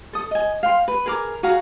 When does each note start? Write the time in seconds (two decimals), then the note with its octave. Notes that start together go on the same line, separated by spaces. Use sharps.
0.13 A4 D#6
0.31 D#5 G#5
0.63 F5 G5 C6
0.88 B4
1.06 G#4 A#4 D6
1.43 F#4 G#4 F5 A#5